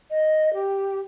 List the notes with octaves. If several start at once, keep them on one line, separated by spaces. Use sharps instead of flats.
D#5
G4